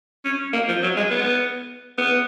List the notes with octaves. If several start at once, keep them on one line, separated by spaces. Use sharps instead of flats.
C#4
A#3
F3
F#3
G#3
B3
B3